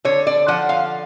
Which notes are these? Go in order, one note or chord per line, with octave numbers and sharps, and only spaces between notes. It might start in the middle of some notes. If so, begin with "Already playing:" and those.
D3 C#5
D5
F3 F#5
F5